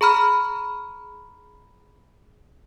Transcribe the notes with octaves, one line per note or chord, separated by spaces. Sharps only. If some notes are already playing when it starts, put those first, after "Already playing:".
G#4 A#5 B5 F6